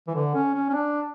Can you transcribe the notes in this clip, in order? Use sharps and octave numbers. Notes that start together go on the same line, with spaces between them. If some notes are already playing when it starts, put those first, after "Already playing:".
E3
D3
C#4
C#4
C#4
D4